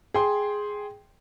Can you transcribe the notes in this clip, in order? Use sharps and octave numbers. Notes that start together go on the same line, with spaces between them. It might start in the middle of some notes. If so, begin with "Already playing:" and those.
G#4 G5 C6